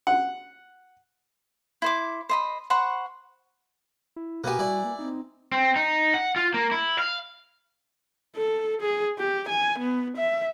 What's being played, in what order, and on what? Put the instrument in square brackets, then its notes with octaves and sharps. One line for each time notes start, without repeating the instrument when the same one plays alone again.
[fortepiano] F#5
[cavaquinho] E4 C5 D6
C5 D#5 B5
C5 F#5 B5 C#6
[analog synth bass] E4
[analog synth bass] B2 [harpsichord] A#3 B3 G4 [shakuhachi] F#4 [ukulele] B4 G#5
[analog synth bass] G3 [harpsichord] E4 D5
[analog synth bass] A#3
[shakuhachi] C4 [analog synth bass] D#4
[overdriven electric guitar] C4
D#4
F#5
F4
A#3
E4
F5
[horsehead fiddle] A4
G#4
G4
G#5
B3
E5